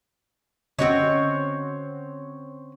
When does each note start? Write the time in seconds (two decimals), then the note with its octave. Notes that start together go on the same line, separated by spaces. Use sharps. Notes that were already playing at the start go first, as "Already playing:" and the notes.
0.79 D3 C4 C#4 F#4 C#5 D#5